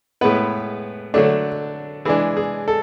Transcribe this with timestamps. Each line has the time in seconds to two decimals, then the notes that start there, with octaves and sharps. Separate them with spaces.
0.21 A2 G#3 B3 B4
1.14 D3 F#3 A3 D4
2.05 E3 G#3 D4 G#4
2.37 G#4
2.68 A4